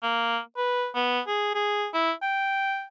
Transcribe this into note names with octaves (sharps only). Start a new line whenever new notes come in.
A#3
B4
B3
G#4
G#4
E4
G5